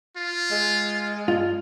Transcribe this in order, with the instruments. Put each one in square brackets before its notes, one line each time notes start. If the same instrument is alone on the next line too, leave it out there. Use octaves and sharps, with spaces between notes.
[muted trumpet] F4
[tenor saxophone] G#3
[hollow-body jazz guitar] G2 F4